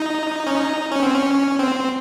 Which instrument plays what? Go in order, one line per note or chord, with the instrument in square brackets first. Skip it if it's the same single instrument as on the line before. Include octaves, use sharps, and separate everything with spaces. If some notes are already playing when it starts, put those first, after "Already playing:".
Already playing: [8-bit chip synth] D#4
C#4
D#4
C#4
C4
C#4
C4